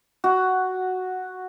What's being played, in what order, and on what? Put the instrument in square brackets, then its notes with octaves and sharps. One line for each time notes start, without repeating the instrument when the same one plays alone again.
[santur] F#4